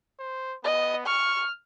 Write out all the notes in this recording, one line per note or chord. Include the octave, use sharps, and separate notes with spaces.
C5
B3 D#5
C#6 F6